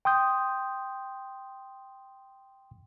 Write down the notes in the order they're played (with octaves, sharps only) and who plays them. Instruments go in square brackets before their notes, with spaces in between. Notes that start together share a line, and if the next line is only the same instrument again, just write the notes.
[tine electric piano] G5 C6 D#6 G6